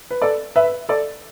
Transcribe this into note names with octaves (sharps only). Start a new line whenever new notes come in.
B4
A4 D5
B4 E5
A4 D5